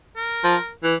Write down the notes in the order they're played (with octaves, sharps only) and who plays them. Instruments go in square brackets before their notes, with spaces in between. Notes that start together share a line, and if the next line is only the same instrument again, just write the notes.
[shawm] A#4
[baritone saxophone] F3
E3